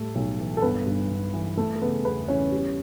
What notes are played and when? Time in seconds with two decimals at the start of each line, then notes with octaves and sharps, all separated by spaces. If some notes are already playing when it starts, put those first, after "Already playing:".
Already playing: A2 G3 A3 A4
0.15 B1
0.40 E3
0.57 A4
0.62 G1 B3 B4
0.86 G2
1.11 G1
1.34 E3
1.57 A3 A4
1.76 A4
1.81 C#3 B3 B4
2.05 E2 B3 B4
2.28 E3 C#4 C#5
2.52 G3